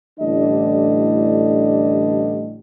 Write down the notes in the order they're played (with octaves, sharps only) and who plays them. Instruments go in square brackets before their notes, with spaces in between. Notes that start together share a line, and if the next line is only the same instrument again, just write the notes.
[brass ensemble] A1 A2 D3 G3 D4 D#5